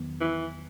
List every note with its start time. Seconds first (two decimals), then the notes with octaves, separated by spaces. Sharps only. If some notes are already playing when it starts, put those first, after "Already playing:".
Already playing: E2 D#3 F#3 B3
0.20 E3